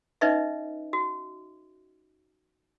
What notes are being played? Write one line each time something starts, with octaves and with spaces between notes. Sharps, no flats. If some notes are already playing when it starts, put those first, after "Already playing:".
C#4 D#4 B4 C#5 D#5 E5
F#4